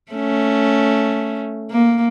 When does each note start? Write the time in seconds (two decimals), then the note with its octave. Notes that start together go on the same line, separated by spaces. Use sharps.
0.12 A3 C#4
1.71 A#3